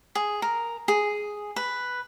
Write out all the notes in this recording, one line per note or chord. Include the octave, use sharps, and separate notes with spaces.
G#4
A#4
G#4
B4